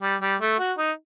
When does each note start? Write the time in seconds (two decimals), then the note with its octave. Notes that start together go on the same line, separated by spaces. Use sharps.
0.02 G3
0.22 G3
0.41 A3
0.59 F#4
0.78 D#4